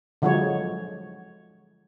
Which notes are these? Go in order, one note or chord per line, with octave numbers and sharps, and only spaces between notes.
D3 F3 F#3 G#3 C#5